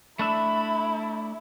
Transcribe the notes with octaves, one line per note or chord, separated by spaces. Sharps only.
A3 D4 E4 E5 B5